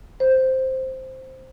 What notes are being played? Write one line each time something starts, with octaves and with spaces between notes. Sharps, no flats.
C5